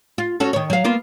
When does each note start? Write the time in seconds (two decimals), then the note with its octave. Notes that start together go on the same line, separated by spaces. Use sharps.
0.18 F4
0.40 C#4 F#4 A4
0.53 D#3 C#5
0.70 F#3 F5
0.84 A#3 B3 F4